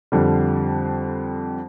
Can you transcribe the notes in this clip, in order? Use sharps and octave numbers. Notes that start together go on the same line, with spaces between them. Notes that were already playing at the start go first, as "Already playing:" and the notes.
F2 D3 G3